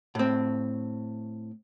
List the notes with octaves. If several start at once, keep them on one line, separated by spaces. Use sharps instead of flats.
A2 C4